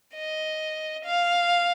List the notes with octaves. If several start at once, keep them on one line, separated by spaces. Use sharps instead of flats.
D#5
F5